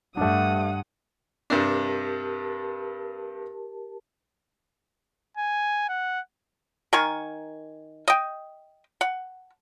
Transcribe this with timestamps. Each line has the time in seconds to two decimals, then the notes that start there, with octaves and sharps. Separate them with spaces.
0.17 G2 A3 D4 F#5 D#6
1.50 G2 C3 D4 G4 A#4 A5
5.37 G#5
5.89 F#5
6.93 D#3 A#4 G#5 C#6
8.08 D#5 G5
9.01 F#5